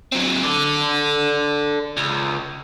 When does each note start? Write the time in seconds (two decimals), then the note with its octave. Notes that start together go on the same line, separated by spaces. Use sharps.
0.12 F#3 C4
0.44 A4 D5
1.97 C#2